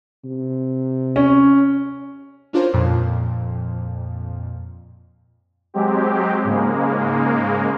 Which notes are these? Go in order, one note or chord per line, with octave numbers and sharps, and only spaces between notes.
C3
C#4
C#4 D4 F4 A#4 C5 C#5
F2 A#2 F3
F#3 G#3 C4 G4
G#2 C#3 G#3 A#3